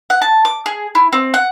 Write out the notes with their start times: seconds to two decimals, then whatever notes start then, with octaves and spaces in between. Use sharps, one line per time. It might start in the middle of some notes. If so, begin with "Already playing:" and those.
0.10 F#5
0.22 A5
0.45 D6
0.66 G#4
0.95 E4
1.13 C4
1.34 F#5